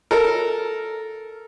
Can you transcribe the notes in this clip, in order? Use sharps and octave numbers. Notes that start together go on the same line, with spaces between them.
A4 A#4